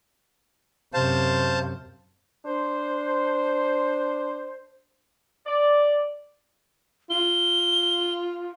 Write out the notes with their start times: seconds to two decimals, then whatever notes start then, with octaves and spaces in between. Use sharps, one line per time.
0.94 F#2 C3 C5 F5 A5
2.45 D4 C5
5.46 D5
7.10 F4 G7